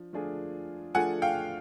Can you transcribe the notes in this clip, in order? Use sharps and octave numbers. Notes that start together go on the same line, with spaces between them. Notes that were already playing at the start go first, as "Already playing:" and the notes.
Already playing: F3 D4
F3 A3 D4 F4 G#4
F3 A3 D4 F4 G#4 F#5 G#5
F5 G5